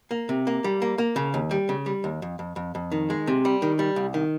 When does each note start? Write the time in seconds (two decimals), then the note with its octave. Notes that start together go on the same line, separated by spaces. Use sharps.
0.11 A#3
0.29 C3
0.47 A#3
0.64 G3
0.82 A#3
0.98 A#3
1.16 C#3
1.34 D#2
1.51 G3
1.69 C#3
1.86 G3
2.04 D#2
2.22 F2
2.39 F2
2.56 F2
2.75 F2
2.92 D#3
3.10 G#3
3.27 C3
3.45 G3
3.62 D#3
3.79 G3
3.96 C2
4.14 D#3